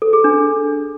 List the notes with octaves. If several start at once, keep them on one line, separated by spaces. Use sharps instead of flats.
A4
G#4
D4